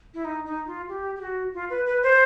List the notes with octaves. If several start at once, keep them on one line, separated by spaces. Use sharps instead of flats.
E4
D#4
D#4
F4
G4
G4
F#4
F4
B4
B4
C5